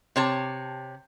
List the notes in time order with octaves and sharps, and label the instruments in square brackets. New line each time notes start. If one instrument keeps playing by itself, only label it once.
[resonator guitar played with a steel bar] C3 C#5 A5